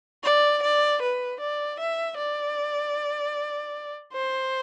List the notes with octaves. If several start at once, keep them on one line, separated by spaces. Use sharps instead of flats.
D5
D5
B4
D5
E5
D5
C5